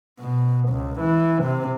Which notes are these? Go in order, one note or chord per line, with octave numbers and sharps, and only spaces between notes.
B2
C#2
E3
C3